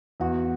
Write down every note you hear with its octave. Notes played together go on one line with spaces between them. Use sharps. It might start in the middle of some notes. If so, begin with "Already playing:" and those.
E2 F#4